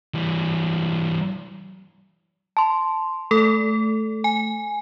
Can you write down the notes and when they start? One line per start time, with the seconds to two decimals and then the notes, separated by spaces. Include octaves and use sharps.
0.14 E3 G3
2.57 A5 C6
3.31 A3 A4
4.24 G#5